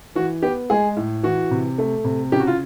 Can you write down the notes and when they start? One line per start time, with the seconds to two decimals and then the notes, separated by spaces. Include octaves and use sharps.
0.15 E3 F#4
0.42 B3 G4
0.70 G#3 G#4
0.96 A2
1.23 E3 F#4
1.51 C3
1.78 A3
2.04 C3
2.32 C#3 G4
2.40 F#4
2.47 F4